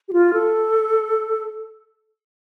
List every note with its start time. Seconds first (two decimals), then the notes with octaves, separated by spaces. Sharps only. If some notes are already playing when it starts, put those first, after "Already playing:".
0.09 G4
0.13 F4
0.33 A4